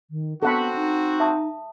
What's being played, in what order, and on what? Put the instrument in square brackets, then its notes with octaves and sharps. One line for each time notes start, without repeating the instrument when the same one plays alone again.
[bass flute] D#3
[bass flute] B3 [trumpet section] C4 F#4 [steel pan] A4 F#5 B5
[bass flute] D#4
[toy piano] E5 A5 D#6